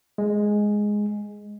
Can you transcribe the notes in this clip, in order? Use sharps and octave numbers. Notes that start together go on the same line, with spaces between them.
G#3